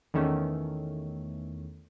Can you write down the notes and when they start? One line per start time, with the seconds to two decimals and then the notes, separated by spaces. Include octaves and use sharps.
0.14 E2 D#3 A3 C#4